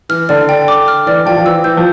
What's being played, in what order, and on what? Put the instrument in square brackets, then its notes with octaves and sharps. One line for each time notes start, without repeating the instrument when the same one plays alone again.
[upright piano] E3 [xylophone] F6
[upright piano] D3 [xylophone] D5
[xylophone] G5
D6
F6
[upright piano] E3 [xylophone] D5
[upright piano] F3 [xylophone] G5
[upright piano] F3
[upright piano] E3 [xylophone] E6
[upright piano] E3 [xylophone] G6
[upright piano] F3